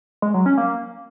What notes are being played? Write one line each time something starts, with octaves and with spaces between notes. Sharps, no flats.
G#3
F#3
C#4
A#3